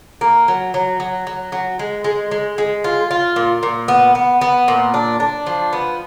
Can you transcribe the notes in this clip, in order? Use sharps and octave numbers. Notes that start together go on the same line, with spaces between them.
A#3
F#3
F#3
F#3
F#3
F#3
G#3
G#3
G#3
G#3
F4
F4
A#2
A#2
B3
B3
B3
A#2
D4
D4
F3
B3